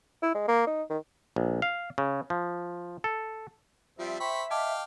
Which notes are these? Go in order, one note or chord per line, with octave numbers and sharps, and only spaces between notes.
E4
G#3
A#3
D#4
D#3
A#1
F5
C#3
F3
A4
F3 G3 C4 F4 E5
C5 G5 B5 C#6
D#5 F5 G5 A5 D6